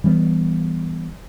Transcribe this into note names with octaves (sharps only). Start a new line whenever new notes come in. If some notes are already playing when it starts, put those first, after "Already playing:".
E3 G3 A#3 B3